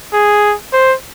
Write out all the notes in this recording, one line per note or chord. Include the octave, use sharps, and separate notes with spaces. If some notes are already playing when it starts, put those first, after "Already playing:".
G#4
C5